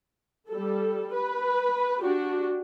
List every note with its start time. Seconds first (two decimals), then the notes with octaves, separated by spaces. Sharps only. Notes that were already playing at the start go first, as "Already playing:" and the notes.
0.49 G3 A4
1.13 B4
2.01 D4 F#4 G4